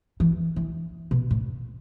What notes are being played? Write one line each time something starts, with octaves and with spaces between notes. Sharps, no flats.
E3
E3
B2
A2